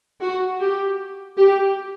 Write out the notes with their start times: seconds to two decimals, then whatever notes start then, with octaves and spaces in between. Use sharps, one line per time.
0.21 F#4
0.60 G4
1.38 G4